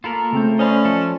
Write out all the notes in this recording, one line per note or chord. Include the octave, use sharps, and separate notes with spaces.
A#3 F4 A4 A#4 B5
C#3 A3 C4 G6
C#4 C5 D5 D#5 F5 B5
F3 A4